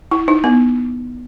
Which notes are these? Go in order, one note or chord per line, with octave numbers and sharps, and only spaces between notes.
E4
D#4
B3